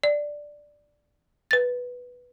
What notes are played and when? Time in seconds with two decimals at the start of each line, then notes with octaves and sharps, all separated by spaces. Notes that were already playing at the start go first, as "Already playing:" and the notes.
0.04 D5
1.51 B4 A6